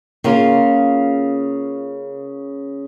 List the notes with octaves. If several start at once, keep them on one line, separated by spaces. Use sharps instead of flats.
C#3 A#3 F4